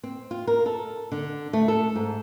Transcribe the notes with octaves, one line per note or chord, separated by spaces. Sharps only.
C4
F4
A#4
A4
D3
A3
A4
G#2